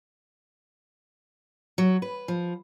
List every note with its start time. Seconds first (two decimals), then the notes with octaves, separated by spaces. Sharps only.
1.78 F#3
2.02 B4
2.28 F3